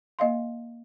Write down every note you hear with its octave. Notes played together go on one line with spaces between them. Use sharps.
A#3 D#5 F5 C6